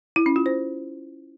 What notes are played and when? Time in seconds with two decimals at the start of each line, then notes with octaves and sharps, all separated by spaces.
0.16 E4
0.26 C#4
0.36 F4
0.46 C5